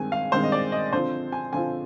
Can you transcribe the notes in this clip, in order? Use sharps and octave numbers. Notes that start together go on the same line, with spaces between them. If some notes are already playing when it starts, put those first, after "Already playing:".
Already playing: G2 D#3 G#3 C4 G#5
F5
G2 D#3 G#3 C4 C5
D#5
D5
D#5
D3 F3 C4 F4 C5
G#5
D3 F3 C4 F4 G#5